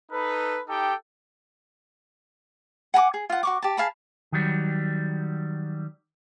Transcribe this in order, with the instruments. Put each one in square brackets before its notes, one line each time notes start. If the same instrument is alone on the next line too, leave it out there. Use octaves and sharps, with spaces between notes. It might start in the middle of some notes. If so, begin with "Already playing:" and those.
[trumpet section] D#4 A4 B4
D#4 G4 A4 G5
[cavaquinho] F#5 G#5 A#5 D6
G#4
F4 F#5
F#4 C#6 D6
G4 A5
G#4 F5 A5 B5
[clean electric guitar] D#3 F#3 G3